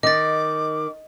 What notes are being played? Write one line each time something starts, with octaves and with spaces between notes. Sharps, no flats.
D#3 D#5 D6 A6